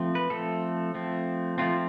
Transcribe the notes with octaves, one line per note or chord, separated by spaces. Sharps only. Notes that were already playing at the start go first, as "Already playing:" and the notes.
Already playing: F3 A3 C4
B4
F3 A3 C4 A4
F3 A3 C4
F3 A3 C4 F4